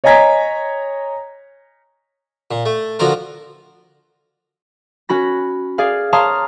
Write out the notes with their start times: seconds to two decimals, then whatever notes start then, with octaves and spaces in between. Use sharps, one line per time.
0.04 C#5 D#5 G#5 A#5 G#6 B6
2.51 A#2
2.66 A3
2.99 D3 F3 F4 F#4 A#4
5.09 C#4 F#4 B5 A#6
5.78 G#4 D5 F5
6.13 C#5 F5 A5 A#5 C6 D#6